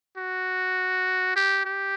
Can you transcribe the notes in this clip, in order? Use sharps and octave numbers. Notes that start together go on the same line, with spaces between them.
F#4
G4
G4